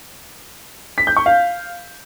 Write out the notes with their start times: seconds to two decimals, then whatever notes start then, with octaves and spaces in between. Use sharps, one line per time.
0.98 B6
1.07 G6
1.17 C#6
1.26 F5